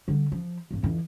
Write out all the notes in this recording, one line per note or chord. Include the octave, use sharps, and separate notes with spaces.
D3 G3
F3
B1 G2
F2 E3